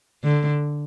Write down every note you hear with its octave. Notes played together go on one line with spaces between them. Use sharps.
D3